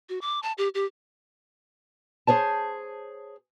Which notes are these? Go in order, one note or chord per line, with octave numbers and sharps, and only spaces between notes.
F#4
D6
A5
G4
G4
G#4 C5 C#5 A5